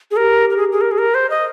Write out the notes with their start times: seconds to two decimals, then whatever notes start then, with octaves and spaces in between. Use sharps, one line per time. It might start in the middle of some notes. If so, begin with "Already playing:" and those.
0.11 G#4
0.17 G4 A#4
0.50 A#4
0.57 G#4
0.72 G#4
0.81 A#4
0.91 G#4
0.98 A#4
1.15 C5
1.30 D#5